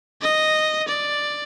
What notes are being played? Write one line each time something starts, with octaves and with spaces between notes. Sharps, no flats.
D#5
D5